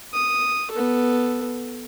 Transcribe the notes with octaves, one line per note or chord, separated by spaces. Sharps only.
D#6
B3 A4